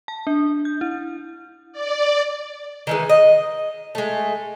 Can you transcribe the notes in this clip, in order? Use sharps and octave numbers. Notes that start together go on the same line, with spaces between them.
A5
D4
G6
E4
D5
D#3 E3 G#3
D#5
G#3 A3